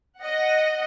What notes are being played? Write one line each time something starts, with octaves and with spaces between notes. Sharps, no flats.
D#5 F#5